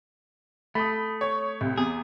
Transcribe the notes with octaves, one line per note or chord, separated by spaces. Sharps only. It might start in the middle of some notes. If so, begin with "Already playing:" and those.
A3 B5 D#6
C#5
C2
E2 G#4